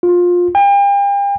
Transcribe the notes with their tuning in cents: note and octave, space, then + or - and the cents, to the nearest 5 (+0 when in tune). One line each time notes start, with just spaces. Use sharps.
F4 +20
G5 +40